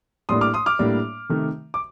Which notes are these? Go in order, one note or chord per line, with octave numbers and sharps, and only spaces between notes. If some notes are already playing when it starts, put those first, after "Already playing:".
A2 G3 A#3 D4 C6 D#6
D6 F6
C6 D#6
D6 F6
A2 G3 A#3 D4
C3 D#3 A3 D#4
D6